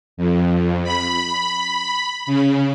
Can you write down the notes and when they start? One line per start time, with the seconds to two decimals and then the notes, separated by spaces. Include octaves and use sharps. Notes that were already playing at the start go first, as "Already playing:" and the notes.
0.17 F2
0.84 B5
2.27 C#3